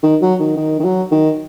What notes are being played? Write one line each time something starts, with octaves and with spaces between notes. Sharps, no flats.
D#3
F#3
D#3
D#3
D#3
F#3
D#3